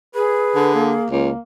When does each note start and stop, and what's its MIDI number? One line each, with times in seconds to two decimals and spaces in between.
0.15 1.05 68
0.15 0.73 71
0.55 0.95 50
0.75 1.08 58
1.11 1.31 37
1.11 1.39 58